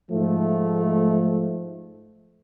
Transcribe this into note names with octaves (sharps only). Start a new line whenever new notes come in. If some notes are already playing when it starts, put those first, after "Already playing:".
G#2 F3 A3